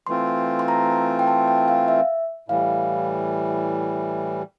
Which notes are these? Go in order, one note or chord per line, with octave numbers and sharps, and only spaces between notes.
E3 A3 C4 F4 C6
C6
A#5
G5
A5
G5
F5
E5
A2 E3 G3 F5